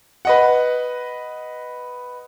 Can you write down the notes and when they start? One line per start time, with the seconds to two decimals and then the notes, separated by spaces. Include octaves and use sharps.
0.25 B4 D#5 F#5